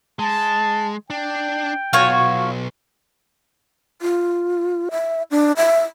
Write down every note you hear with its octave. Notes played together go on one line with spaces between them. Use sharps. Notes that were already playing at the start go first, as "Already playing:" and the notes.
G#3 A5
D4 G5
B1 F4 F#4 C#5
F4
E5
D4
E5